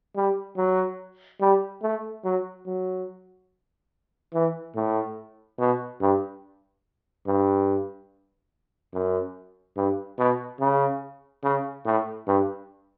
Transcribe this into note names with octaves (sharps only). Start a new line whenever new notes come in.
G3
F#3
G3
A3
F#3
F#3
E3
A2
B2
G2
G2
F#2
G2
B2
C#3
C#3
A2
G2